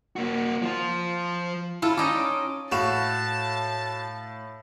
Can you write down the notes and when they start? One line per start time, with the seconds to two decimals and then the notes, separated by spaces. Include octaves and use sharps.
0.16 A#3 F#4
0.62 F3 F4
1.82 E4 F4 A4
1.97 C#4 D#4 D#5 D6
2.72 A2 F#4 F5 A5 E7